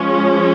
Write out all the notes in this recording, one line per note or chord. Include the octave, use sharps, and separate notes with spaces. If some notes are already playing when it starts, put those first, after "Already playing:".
Already playing: F3 G#3 C#4